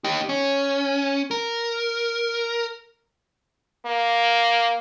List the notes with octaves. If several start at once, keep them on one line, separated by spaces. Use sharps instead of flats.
D#4 G4
C#4
A#4
A#3